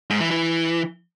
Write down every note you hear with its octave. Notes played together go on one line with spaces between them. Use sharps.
G#2
E3
E3